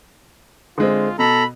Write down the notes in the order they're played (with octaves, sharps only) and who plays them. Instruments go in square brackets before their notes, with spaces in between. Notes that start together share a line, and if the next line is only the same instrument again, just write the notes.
[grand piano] D3 G#3 C4 [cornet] F4
[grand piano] B2 [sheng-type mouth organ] A4 A#5 [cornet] B5